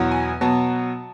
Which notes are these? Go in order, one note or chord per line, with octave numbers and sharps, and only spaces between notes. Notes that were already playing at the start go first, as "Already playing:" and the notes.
Already playing: E2 B2 F#3 B3
G#5
B2 F#3 B3 A5